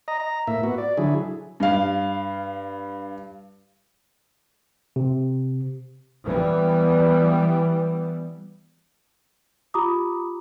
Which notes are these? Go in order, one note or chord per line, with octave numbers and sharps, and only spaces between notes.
D#5 A#5
A#5
A2 A#3 E5
B3 F#4
D5
D3 F#3 E4 G#4
G2 F5
C3
E3 G3 B3
F4 G4 A#5 B5 D6 D#6